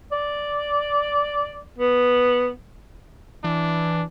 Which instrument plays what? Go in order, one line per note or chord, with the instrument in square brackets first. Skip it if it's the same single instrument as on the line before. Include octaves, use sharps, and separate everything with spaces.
[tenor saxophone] D5
B3
[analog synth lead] E3 [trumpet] D4